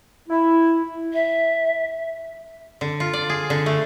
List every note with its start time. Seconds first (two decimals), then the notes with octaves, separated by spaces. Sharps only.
0.29 E4
1.13 E5
2.81 D3
3.00 F4
3.13 D5
3.30 G#4
3.50 D3
3.66 A3